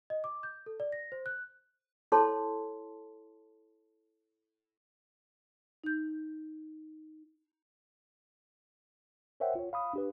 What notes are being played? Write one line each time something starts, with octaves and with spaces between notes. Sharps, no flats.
D#5
D6
G6
A4
D5
A#6
C5
F#6
E4 A4 C#5 A5 C6
D#4 G6
A#4 C5 C#5 E5 F#5 G5
F4 C#5
F5 B5 D#6
D4 G4 B4